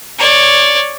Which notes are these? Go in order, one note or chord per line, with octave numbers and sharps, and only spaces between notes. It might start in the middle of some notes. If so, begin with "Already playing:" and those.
C#5 D5